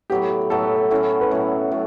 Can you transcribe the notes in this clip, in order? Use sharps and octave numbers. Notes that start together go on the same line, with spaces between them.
A2 F#3 B3 G4
A2 F#3 B3 A4
A2 F#3 C#4 E4
B4
A2 F#3 C#4 E4 C#5
A2 F#3